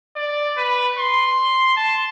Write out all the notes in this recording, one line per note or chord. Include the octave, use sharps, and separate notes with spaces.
D5
B4
C6
A5